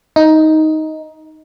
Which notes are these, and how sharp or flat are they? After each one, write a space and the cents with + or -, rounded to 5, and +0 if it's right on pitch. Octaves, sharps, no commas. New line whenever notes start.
D#4 +10